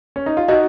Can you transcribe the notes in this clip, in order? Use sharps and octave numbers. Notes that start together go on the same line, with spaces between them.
C#4
D#4
F4
D#4 F#4 D#5